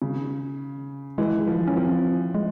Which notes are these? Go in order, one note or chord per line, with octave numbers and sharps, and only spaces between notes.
C#3
E3 G#3
F3
C#4
F3 C4
G#3